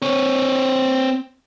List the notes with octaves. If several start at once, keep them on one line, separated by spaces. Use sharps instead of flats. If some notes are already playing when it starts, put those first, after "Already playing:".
C4 C#5